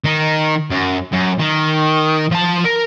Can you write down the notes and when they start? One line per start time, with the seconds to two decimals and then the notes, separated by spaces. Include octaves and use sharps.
0.04 D#3 D#4
0.70 F#2
1.12 F#2
1.39 D#3
2.31 F3 A5
2.65 A#4